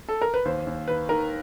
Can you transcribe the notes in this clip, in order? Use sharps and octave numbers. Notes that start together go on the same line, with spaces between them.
A4
A#4
B4
D#2 C5
D#2
D#3 B4
D#3 A#4